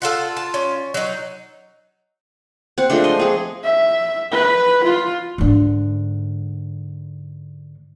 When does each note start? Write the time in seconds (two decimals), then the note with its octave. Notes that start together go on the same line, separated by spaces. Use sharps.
0.02 F4 A4 F5 F#5
0.37 A5
0.54 C#4
0.94 F#3 D#4
2.78 C4 F#5
2.90 F3 G#3 A3 D4
3.04 D#5 C6
3.19 C4 G#4
3.63 E5
4.31 B4
4.84 F4
5.38 G#2 D3